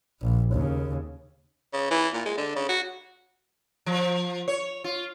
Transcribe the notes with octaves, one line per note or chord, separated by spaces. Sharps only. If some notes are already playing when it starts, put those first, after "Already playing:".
A#1
D#2 C#3
C#3
E3
A#2
G#3
D3
C#3
F#4
F3
C#5
F4